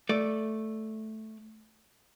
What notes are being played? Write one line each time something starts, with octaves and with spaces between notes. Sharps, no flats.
A3 D5